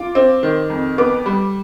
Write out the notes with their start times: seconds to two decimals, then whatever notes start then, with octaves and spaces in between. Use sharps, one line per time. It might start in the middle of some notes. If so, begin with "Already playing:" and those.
Already playing: F4 D6
0.15 C4
0.43 D#3
0.70 F2
0.98 B3 D6
1.26 G3